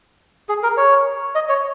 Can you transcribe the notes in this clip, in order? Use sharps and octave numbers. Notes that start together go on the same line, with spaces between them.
G#4
A#4
C#5
D#5
C#5